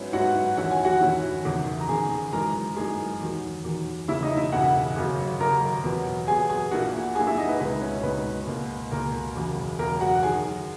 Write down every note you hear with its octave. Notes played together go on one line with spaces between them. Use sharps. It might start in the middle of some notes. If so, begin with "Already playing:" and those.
Already playing: G#2 F#3 B3 C#4 E4
G#2 F#3 B3 E4 F#4 F#5
E2 D#3 F#3 C#4 E4 F#5
G#5
F#4 F#5
E2 D#3 F#3 C#4 E4
F#1 E2 D#3
A#5
F#1 E2 D#3 G#4 G#5
F#2 E3 G#3 D#4 A#4 A#5
F#2 E3 G#3 D#4 G#4 G#5
E2 D#3 F#3
E2 D#3 F#3
E1 E2 C#3 E4 E5
D#4 D#5
E4 E5
E1 E2 C#3 F#4 F#5
G#1 F#2 C#3 F#3
G#1 F#2 C#3 F#3 A#4 A#5
E2 B2 F#3 B3
E2 B2 F#3 B3 G#4 G#5
G#4 G#5
A#1 A#2 A#3 E4 F#4 F#5
A#1 A#2 A#3 E4 G#4 G#5
E4 E5
D#4 D#5
B4
C#2 B2 G#3 D#4 B4
C#4 C#5
C#2 B2 G#3 D#4 B4
C#2 B2 A#3
C#2 B2 A#3 A#4
E1 E2 C#3 F#3
E1 E2 C#3 F#3 A#4
F#4 F#5
F#5
F#2 D#3 F#3 G#4 G#5